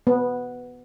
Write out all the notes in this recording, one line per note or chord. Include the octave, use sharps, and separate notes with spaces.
B3